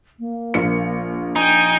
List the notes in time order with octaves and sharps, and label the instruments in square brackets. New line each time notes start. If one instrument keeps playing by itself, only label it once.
[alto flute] A#3
[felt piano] A#1 A#4 C#7
[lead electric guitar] D#4 [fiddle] G5 G#5